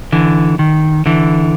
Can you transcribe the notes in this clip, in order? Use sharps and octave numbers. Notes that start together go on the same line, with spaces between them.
D3 E3
D#3
D3 E3